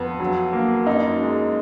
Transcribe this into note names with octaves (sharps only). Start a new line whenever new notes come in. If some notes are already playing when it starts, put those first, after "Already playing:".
Already playing: F2 B3
F#3
A#3
F#2 D#4
G#3